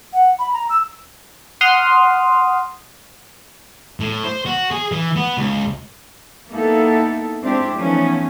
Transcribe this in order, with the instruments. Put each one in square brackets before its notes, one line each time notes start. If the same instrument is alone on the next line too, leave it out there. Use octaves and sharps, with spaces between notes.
[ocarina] F#5
B5
A#5
E6
[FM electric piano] F#5 C6 D#6 F6
[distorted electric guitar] A2
C5
F#4
G#4
E3
B3
C#2
[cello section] A#3 B3 D#4 E4 A4
G#3 C4 D4 E4 G4
E3 F3 A3 B3 C#4 D#4